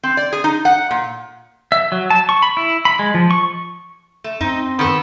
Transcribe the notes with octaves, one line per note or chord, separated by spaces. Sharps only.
C4
D5
G#4
D#4
F#5
A#2
E5
F#3
A5
C#6
B5
E4
B5
G#3
F3
C#6
A3
F#2 C4 D#4
D#3 B3 A4